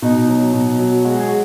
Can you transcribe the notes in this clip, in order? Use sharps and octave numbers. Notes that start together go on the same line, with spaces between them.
B2 D#4
F#3
B2
F#3
G#3 F#4
G#4
F#4